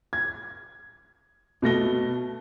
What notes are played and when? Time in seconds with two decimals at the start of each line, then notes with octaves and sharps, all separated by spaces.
0.13 G#6
1.62 B2 A3 A#6 G7